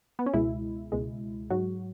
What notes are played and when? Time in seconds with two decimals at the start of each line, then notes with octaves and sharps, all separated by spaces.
0.19 B3
0.26 C#4
0.33 C#2 B2 G#3 E4
0.92 C#2 B2 G#3
1.50 G#2 F#3 F#4